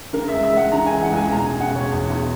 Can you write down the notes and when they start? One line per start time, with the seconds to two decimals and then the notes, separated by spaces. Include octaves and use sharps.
0.13 C#3 A#4
0.28 E5
0.32 C#2
0.43 E5
0.52 G#3 F#5
0.72 C#3 A#5
0.87 G#5
0.92 E3
1.02 F#5
1.11 C#2
1.16 G#5
1.31 E1 A#5
1.46 G#5
1.51 C#3
1.60 F#5
1.71 E1
1.76 C#5
1.91 E2
2.10 E2